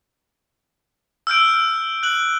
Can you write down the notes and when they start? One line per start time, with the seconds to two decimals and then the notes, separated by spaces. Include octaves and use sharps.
1.27 E6 F6 G6 D7
2.03 F#6 F#7